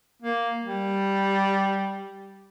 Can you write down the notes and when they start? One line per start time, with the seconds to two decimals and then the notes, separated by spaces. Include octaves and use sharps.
0.22 A#3
0.63 G3